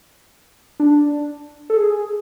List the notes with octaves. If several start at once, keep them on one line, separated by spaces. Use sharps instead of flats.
D4
A4
G#4